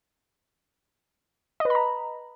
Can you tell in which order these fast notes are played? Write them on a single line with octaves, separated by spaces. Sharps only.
D#5 B4 B5 A#5